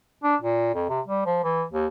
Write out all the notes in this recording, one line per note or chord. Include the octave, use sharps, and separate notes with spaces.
D4
A#2
F2
C3
G3
F3
E3
D#2